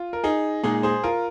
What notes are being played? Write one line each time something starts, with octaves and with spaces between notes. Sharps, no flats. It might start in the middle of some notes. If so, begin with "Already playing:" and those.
Already playing: F4
A#4
D#4 G#4
A#2 G#3 D#4 G#4
G#4 C5
F4 A#4